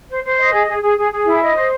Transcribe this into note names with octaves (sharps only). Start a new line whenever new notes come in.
C5
C5
D#5
G#4
G#4
G#4
G#4
G#4
E4
D#5
C5